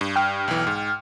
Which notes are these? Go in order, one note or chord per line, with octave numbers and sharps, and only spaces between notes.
G2
G5 F6
B1 E3
G#2